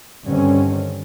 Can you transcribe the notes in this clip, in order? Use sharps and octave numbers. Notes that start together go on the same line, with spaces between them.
G2 D3 D#3 C4 C#4